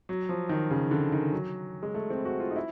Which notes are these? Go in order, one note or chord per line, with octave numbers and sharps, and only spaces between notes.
F#3
F3
D#3
C#3
D3
D#3
F#3
G#3
A3
C4
F#4
F4
D#4
E4